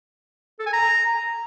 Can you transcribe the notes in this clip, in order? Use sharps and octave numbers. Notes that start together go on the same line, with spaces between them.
A4
G#5
A#5